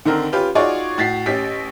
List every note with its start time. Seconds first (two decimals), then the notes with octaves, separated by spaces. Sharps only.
0.05 D3 D#3 C4 A#4
0.32 C#4 F4 G4 B4
0.55 D#4 F4 F#4 G#4 C#5 D5
0.98 A2 F#4 A6 B6 C7
1.26 A1 C#4 G4 B6